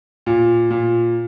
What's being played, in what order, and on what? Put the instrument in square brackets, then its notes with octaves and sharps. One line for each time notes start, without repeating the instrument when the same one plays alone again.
[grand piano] A#2
A#2